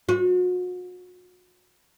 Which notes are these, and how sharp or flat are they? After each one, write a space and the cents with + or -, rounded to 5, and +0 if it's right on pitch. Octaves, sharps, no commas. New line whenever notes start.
F#4 -40